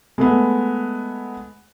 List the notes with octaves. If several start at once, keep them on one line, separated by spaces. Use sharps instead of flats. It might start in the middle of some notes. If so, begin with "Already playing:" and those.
G#3 A3 B3